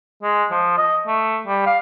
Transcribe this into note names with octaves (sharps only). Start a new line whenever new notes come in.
G#3
F3
D#5
A3
G3
F5